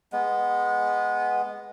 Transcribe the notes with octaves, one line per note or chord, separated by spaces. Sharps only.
G#3 B3